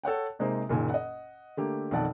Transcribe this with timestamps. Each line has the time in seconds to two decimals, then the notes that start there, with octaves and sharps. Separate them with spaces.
0.03 A4 C#5 F#5 G5
0.39 C3 G#3 A#3 D#4 C5
0.69 F#1 A#2 D#3 G#5
0.90 D#5 F#5
1.57 D3 A3 A#3 G4
1.91 B1 F2 D#3 D5 F#5 A5